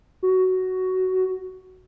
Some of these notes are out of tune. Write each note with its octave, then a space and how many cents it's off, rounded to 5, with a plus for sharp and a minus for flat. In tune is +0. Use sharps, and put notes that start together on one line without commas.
F#4 +10